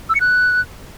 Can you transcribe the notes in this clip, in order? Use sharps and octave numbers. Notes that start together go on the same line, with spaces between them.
E6
C#7
F#6